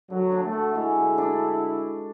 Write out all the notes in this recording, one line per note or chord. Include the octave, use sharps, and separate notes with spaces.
D3 F#3
D4
A3
F#4
G#3 E4
D3
D4